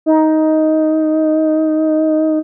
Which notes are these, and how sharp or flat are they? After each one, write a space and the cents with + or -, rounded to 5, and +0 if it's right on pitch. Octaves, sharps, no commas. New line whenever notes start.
D#4 +10